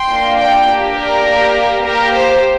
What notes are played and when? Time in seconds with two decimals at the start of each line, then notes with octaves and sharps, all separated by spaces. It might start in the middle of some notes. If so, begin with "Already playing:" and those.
Already playing: G5 C6
0.09 A#3 D4 F4
0.37 D5 G5
0.67 A#3 D4 G4
0.96 A#4 D5
1.25 A#3 G4
1.84 A#3 G4 A#4
2.13 C5